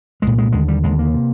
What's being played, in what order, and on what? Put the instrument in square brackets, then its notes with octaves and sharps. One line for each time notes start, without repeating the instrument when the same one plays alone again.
[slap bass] C2 A#2 G#3
G#3
D#2 D3 G#3
G3
D#2 D3 G#3
A#3
C3